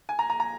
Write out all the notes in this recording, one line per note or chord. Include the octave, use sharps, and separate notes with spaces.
G#5
A#5
A#5
A#5